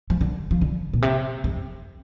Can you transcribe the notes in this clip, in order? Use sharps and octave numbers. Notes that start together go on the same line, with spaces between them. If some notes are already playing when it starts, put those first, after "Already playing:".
F3
D3
F3
D3
A#2
C3
F2